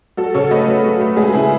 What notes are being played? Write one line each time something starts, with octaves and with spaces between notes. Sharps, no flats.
F#3 F#4 A4
C#3 A4 C#5
A3 B4 D#5
F#3
F#3
A3
G#3 G#4 B4
C#3 E4 G#4